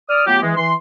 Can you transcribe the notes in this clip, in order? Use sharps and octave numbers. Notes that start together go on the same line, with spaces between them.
D5 D#6 F6
F#3 A3 B3 F4 G4
E3 G#3
E3 C6